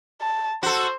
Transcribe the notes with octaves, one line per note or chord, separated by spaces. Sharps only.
A5
F#4 A4 C5